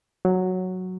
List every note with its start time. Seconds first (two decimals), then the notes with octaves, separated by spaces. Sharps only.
0.25 F#3